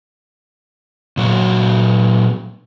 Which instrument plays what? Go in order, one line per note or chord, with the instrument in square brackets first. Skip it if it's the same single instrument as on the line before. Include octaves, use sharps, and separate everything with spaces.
[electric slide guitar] A#2 F#3 F#4